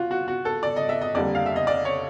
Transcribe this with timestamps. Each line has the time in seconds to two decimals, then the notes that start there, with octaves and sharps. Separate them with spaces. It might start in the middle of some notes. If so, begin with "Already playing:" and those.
Already playing: F4 F#4
0.11 F#4
0.28 F#4
0.45 A4
0.63 D5
0.76 D#5
0.89 E5
1.02 D#5
1.15 F2 D3 G3 A#3 D5
1.35 F5
1.46 E5
1.56 D#5
1.67 D5
1.85 C#5